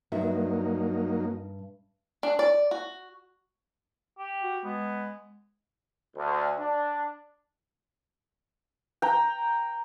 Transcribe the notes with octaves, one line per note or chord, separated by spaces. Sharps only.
G2 F#3 A#3 D#4 E5
D4
D5
F#4
G4
F#4
G#3 B3
D2
D4
G5 A#5